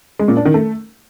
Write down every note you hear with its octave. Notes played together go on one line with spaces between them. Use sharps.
G#3
A#2
D4
D#3
A3